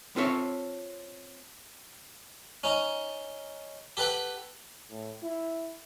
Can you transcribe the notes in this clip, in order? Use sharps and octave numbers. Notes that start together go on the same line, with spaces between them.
C4 F4 A4 C#5 E5
C#4 D#4
G4 A4 B4 F#5 G5
A2
E4